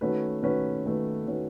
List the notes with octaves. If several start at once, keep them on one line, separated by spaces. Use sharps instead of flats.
D#3 A3 C#4 F#4 B4
D#3 A3 C#4 F#4 B4
D#3 A3 C#4 F#4 B4
D#3 A3 C#4 F#4 B4